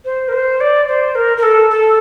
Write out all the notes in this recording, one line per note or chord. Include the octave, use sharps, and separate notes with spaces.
C5
A#4
C5
D5
C5
A#4
A#4
A4
A4